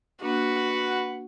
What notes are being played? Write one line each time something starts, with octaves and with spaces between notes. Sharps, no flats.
A#3 D4 F#4 B4 F#5